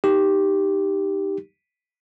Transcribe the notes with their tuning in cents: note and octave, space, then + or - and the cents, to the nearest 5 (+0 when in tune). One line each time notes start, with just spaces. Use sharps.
D#4 +5 G4 +0